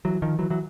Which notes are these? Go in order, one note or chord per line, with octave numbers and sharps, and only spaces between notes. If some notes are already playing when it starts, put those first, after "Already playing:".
E3 F#3
D#3 F3
E3 F#3
E3 F#3